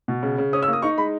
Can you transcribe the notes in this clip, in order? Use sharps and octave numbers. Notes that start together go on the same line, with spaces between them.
B2
C#3
C#3
C#4 D#6
E6
A#3
D#6
D#4 C#6
G#3 B5